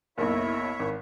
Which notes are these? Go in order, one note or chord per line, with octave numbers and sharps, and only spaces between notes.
F#1 B1 E4 C#5 E5
G#1